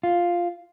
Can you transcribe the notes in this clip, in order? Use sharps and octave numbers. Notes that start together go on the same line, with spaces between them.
F4